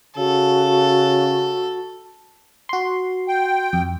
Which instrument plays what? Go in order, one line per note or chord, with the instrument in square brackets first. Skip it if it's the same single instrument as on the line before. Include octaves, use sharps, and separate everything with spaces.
[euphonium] C#3 [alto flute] F#4 [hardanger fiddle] A4
[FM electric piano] F#4 C6
[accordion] G5
[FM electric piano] F2